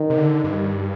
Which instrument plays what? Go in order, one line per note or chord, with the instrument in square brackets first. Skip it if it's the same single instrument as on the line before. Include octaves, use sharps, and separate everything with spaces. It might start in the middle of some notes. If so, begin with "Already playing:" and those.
Already playing: [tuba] D#3
[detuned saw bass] C3
D3
G2